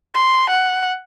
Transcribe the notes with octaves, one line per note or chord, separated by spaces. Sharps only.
C6
F#5